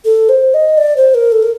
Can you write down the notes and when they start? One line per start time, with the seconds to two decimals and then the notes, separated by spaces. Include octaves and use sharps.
0.05 A4
0.29 C5
0.54 D#5
0.77 D5
0.97 C5
1.14 A#4
1.32 A4
1.43 A#4